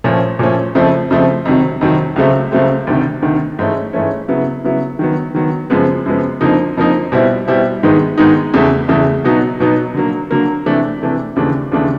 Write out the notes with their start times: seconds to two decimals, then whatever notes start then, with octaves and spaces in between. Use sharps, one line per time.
0.04 A#2 F3 A3 C#4
0.39 A#2 F3 A3 C#4
0.75 F2 C#3 F3 A3 C4
1.10 F2 C#3 F3 A3 C4
1.45 F2 C3 D#3 F#3
1.81 F2 C3 D#3 F#3
2.16 C#2 C#3 F#3 A3 C4
2.52 C#2 C#3 F#3 A3 C4
2.87 D2 C3 D#3
3.23 D2 C3 D#3
3.59 G#2 E3 A3 C#4
3.93 G#2 E3 A3 C#4
4.28 C#3 F#3 B3 E4
4.64 C#3 F#3 B3 E4
4.99 D#3 F#3 B3
5.35 D#3 F#3 B3
5.70 F#2 C#3 F3 G#3 B3
6.06 F#2 C#3 F3 G#3 B3
6.41 F2 D3 F3 A#3 D#4
6.77 F2 D3 F3 A#3 D#4
7.12 B2 G3 C4 E4
7.48 B2 G3 C4 E4
7.83 G#2 D#3 G#3 B3 D#4
8.18 G#2 D#3 G#3 B3 D#4
8.54 E2 C#3 E3 A3
8.89 E2 C#3 E3 A3
9.24 B2 F#3 B3 D#4
9.60 B2 F#3 B3 D#4
9.94 D3 F#3 A#3
10.31 D3 F#3 A#3
10.66 C3 E3 A3 D4
11.02 C3 E3 A3 D4
11.36 D#2 C#3 E3 A3 D4
11.72 D#2 C#3 E3 A3 D4